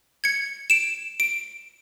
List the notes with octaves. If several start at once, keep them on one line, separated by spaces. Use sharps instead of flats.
G#6 C#7
D7 E7
D7